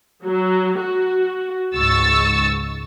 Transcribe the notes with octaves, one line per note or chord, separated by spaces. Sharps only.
F#3
F#4
C#2 G#2 C#6 E6 A6